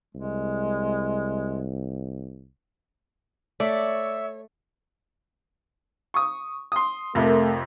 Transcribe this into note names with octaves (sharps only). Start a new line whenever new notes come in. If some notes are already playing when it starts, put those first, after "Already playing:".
C2 G#3
A3 C#5 D5 E5
C#6 D#6
C6 D#6
F2 C3 A3 A#4